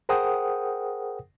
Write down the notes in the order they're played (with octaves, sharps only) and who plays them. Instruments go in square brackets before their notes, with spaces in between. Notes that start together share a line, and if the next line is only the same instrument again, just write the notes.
[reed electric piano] G#4 A#4 C5 F#5 G5 D#6